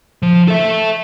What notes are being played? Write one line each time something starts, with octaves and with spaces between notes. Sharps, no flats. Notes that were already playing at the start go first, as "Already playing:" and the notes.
F3
A4 E5